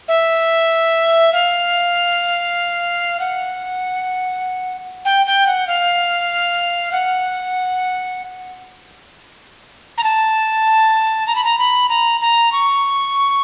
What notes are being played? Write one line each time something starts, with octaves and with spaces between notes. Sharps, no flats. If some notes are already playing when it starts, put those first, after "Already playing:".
E5
F5
F#5
G5
G5
F#5
F5
F#5
A#5
A5
A#5
B5
A#5
B5
A#5
A#5
C#6